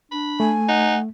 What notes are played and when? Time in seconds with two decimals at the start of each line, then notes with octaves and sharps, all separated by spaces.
0.12 D4 B5
0.40 A3 G#5
0.69 D#4 F#5